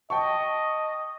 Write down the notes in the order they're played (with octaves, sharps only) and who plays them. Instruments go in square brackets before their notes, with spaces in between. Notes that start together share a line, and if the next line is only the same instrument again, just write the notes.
[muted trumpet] D#5 [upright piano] G5 A5 C#6